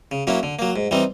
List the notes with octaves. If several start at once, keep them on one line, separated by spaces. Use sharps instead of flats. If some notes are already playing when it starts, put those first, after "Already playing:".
C#3
F#3 A#3 C#4 E4
D3
F#3 A#3
G#2
E3 G3 C4 D#4